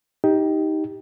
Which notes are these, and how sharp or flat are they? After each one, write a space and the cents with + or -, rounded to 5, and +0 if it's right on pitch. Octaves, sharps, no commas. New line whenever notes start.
D#4 +15 G4 +0